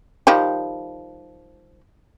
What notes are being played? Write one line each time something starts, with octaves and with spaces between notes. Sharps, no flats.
D#3 F3 G3